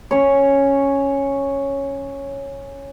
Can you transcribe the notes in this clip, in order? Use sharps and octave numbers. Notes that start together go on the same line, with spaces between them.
C#4 C#5